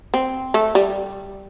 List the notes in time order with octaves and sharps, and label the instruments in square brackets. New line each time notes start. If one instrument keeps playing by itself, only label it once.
[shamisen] C4
A3
G3